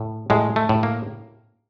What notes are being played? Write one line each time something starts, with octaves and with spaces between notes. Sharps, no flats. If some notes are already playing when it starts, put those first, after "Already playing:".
Already playing: A2
A2 G#3
A3
A2
A#3